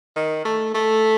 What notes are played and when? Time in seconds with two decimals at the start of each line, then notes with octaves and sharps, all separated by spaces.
0.16 D#3
0.45 A3
0.74 A3